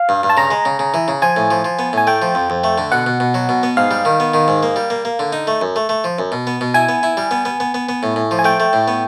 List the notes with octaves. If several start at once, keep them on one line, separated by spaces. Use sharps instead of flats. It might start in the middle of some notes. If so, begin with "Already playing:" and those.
Already playing: F5
G2
G2
A5
C#3 A#5
G#3
C#3
C#3
E3
C#3
F3 G#5
A2
F3
F3
B3
A2 G#5
A3 G5
F3
F2
F2
A3
D3
B2 F#5
B2
B2
F#3
B2
B3
G#2 F5
G3
D#3
B3
D#3
G#2
A#3
G3
A#3
A#3
D3
D#4
A3
F#2
A3
A3
F3
F#2
B2
B3
B2
E4 G#5
B3
E4
G3
B3
B3
B3
B3
B3
A2
A2
F3
G#5
A3 G5
A3
A2
B3